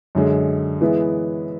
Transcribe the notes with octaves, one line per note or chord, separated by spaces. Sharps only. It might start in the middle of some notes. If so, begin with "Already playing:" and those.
F#2 D3 G#3
E3 G#3 B3 E4